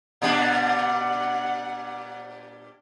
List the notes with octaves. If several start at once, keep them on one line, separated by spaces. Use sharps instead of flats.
A#2 G3 D4 F#5